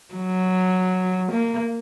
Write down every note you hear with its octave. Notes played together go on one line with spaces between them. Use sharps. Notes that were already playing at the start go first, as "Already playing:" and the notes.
F#3
A#3